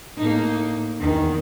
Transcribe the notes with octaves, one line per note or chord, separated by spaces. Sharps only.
A2 A#3 D#4
E2 D#3